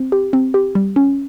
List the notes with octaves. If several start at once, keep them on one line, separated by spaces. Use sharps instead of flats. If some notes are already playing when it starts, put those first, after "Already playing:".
Already playing: C4
G4
C4
G4
G3
C#4